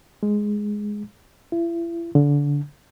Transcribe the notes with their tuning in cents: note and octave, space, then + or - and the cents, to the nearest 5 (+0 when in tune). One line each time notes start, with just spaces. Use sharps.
G#3 +0
E4 +40
D3 -25